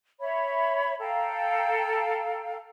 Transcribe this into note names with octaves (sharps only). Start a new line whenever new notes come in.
C#5 E5 B5
A4 F5 G5 A#5